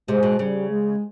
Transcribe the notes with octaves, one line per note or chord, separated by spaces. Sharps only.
C3 G#3
B2
C#3 G3
G#3